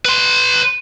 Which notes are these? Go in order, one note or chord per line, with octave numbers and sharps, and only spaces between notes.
B4 C6